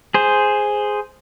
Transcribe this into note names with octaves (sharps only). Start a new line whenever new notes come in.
G#4 C5